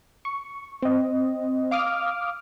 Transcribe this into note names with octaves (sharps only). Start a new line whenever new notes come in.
C#6
C4 D#5
F5 D6 D#6 F6